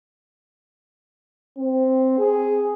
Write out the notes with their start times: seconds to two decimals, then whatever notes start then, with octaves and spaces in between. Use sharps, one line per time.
1.58 C4
2.19 G#4